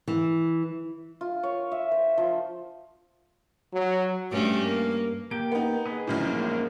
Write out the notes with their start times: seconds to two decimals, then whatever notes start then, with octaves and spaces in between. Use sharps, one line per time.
0.08 E3
1.21 F4
1.43 C#5
1.71 E5
1.92 C5
2.18 F3
3.73 F#3
4.32 G2 A3 C#4
4.64 A#3
5.31 A#3 G4 G5 D7
5.52 B3 D#4
5.86 G#4 B4 D#5
6.07 A#1 F#2 A2
6.25 G#3 A#3 D#4